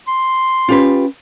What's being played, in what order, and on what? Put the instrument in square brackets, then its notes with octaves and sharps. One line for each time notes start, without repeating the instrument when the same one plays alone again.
[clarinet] C6
[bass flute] C#4 [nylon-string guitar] F4 G4 B4